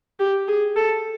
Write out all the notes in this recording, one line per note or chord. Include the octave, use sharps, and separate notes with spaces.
G4
G#4
A4